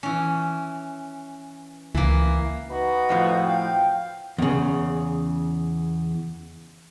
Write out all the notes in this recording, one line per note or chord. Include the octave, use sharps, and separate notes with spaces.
E3 C#4
C#2 E3 A#3
D#4 F#4 B4
F2 A2 F3
F5 G5
E2 C#3